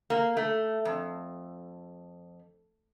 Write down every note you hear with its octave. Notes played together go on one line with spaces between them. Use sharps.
A#3
A3
F2